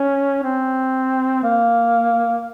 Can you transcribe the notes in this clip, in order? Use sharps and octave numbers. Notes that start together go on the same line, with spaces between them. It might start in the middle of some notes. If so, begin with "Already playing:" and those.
Already playing: C#4
C4
A#3